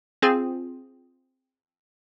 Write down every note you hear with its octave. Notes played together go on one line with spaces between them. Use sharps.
C4 F4 G#4